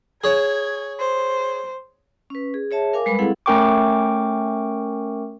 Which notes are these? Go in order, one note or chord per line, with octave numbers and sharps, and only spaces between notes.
G#4 C#5 G#6
C5
C#4 B4
G#4
G#4 C#5 E5 A5
A#4 F5 G#5 D6
G3 G#3 B4 B5
C4 E4 G#4 A4 F5 F#5
A3 C#4 A#4 G5 C#6 D6